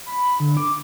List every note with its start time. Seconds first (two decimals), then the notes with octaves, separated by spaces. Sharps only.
0.06 B5
0.40 D3
0.57 D6